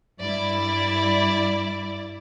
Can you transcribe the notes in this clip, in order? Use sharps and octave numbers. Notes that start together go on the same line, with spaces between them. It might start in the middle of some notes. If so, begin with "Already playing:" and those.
G2 E4 D5